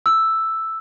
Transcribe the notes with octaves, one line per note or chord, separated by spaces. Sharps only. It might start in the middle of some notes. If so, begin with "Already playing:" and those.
E6